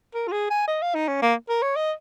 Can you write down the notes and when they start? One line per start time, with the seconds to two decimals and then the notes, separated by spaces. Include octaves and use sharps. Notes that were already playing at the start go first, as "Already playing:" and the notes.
0.14 A#4
0.28 F4
0.32 G#4
0.50 G#5
0.67 D#5
0.82 F5
0.95 D#4
1.08 C#4
1.22 A#3
1.49 A#4
1.62 C#5
1.76 D#5